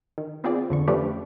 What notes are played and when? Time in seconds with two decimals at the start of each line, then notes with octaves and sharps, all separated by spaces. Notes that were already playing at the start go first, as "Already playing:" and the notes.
0.18 D#3
0.44 B3 C4 F4 G#4 D5
0.70 F2 D3 C#6
0.88 F3 A3 C#4 D4 G4 B4